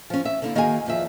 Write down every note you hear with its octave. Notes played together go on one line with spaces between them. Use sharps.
F3 C#4
E5
D3 A#3 E4
D#3 A#3 F#4 G#4 E5 G#5
E2 F3 E5